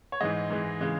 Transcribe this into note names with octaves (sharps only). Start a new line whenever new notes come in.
C#5
G#2 E3 G#3 D#5
G#2 E3 G#3
C#3 E3 G#3